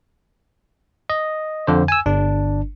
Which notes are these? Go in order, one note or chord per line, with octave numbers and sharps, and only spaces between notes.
D#5
F2 D3 C5
G#5 E6
G1 D4